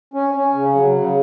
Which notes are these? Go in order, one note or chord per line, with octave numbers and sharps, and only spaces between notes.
C#4
C#4
C#3
F#3
C#3